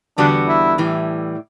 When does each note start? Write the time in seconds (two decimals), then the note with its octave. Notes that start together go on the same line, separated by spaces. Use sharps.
0.18 E2 D3 G3 B3 D4 F#4
0.48 E4
0.78 A2 E3 G3